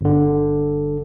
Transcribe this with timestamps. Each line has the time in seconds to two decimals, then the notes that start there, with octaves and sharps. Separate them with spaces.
0.01 G1 D3